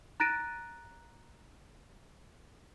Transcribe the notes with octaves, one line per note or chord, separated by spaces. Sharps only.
A#5 F#6 A6 A#6 D7 D#7